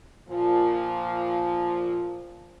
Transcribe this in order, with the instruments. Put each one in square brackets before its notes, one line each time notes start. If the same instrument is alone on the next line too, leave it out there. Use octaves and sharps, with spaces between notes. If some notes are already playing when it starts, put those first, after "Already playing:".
[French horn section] A#2 F3